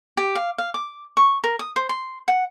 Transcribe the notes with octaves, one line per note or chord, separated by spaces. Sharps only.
G4
F5
F5
D6
C#6
A#4
D#6
C5
C6
F#5